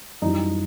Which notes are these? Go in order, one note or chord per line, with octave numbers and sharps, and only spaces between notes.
F#2 E3 G3 D#4